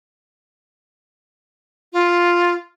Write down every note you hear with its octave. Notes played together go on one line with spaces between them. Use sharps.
F4